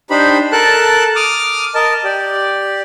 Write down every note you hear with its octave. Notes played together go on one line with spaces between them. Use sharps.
D4 D#4 G4 C5 B5
A4 A#4 A5 F#6
D6 D#6 F6
A#4 D#5 A5
G4 D5